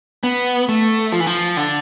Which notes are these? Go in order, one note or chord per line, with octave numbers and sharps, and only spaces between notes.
B3
A3
F3
E3
F3
D3